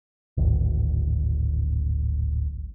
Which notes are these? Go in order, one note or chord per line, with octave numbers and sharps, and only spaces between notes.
D1 G#1